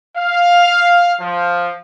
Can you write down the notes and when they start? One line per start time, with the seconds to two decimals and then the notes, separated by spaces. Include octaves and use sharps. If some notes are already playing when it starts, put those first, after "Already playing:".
0.17 F5
1.20 F3